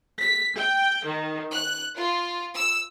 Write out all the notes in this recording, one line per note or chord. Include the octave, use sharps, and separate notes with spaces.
B6
G5
D#3
F#6
F4
E6